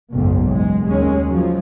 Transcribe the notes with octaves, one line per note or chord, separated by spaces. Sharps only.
F#1 B1 G#2 B2
G#3
D#2 G#3 C#4
F3 F#3